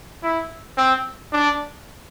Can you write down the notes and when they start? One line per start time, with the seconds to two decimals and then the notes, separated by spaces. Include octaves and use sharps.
0.23 E4
0.77 C4
1.33 D4